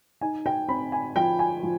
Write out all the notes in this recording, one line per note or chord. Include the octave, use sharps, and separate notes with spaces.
D#4 G#5
G5
C4 B5
G#5
F3 G5
G#5
F3